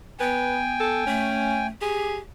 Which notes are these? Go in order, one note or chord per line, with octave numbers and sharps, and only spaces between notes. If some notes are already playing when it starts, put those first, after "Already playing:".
B3 B4 G5 G#5
A4
A3 C#4
G4 G#4